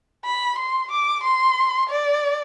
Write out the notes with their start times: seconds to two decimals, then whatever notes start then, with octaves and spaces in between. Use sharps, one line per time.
0.25 B5
0.59 C6
0.91 D6
1.24 C6
1.90 D5